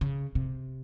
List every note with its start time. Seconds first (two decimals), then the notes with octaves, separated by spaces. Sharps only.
0.01 C#3
0.35 C3